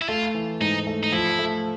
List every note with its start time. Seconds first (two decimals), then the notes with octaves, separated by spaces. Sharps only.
0.02 E4
0.09 A3 F4
0.34 E3
0.61 G#2 D#4
0.87 A3
1.03 D#4
1.12 F3 E4
1.39 A3